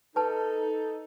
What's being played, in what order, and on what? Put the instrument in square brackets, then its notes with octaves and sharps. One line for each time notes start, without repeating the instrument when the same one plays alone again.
[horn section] D#4 A4 [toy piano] B4 A5